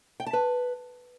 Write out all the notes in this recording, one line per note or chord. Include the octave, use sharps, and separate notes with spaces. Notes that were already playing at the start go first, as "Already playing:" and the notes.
G5
A5
B4